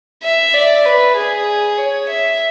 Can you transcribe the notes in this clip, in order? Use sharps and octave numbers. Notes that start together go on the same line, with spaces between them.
E5
D5
B4
G#4
C#5
E5